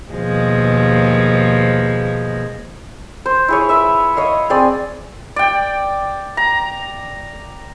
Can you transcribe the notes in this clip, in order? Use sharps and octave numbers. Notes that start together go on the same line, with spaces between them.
D#2 B2 F3 G#3
C5
E4 G#4 C#5
B4 E5
C#5 D#5 F5
C4 G#4 D5
D5 G5
A#5